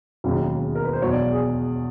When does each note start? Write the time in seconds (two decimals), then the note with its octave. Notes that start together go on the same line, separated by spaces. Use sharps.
0.24 E1 D#2 C#3 F#3
0.75 A#4
0.85 B4
0.93 C5
1.02 E1 E2 B2 F#3 C#5
1.11 D5
1.22 D5
1.32 G#4